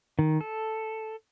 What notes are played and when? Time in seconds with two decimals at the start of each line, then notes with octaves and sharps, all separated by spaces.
0.19 D#3
0.41 A4